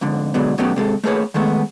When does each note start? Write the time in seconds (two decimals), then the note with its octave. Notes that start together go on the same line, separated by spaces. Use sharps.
0.01 F2 G#2 D3
0.34 B2 D3 F#3 G#3 B3
0.58 B2 F#3 A3 B3 C#4 G4
0.76 C3 G#3 A4
1.04 A3 A#3 G#4 B4 C#5
1.34 D#3 G#3 A3 B3